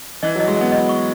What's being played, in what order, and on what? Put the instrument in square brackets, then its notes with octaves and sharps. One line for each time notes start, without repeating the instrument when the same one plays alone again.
[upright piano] E3 [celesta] D#5
[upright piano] F#3
[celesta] D#5
[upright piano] G#3
[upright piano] B3 [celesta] D#5
[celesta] D#5
C#6